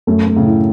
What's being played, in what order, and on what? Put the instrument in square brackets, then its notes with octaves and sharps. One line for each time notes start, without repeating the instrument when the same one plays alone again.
[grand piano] F#2 [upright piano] A3
[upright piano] A3
[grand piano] A2 C#3
[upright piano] E4